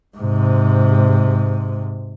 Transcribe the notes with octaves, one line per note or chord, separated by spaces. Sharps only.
G#2 C3